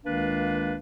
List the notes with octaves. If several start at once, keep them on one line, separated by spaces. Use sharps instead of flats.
C#2 D#3 A#3 D4 B4 F5